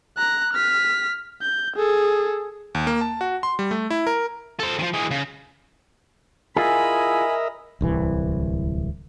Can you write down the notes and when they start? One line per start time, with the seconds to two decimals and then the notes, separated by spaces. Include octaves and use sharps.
0.17 A#5 F#6
0.53 F6 B6
1.42 G6
1.76 G#4 A4
2.75 D#2
2.87 A#3
3.01 A5
3.21 F#4
3.43 C6
3.59 G3
3.71 A3
3.90 E4
4.07 A#4
4.60 A4 C5
4.79 D#3 F3
4.93 E3 G#3
5.11 C#3
6.56 E4 F4 G#4 A#4 D#5 E5 G#5 B5
7.81 D1 C2 E3